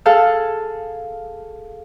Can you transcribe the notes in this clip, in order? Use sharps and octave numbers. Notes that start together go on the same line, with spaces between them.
G#4 A4 F5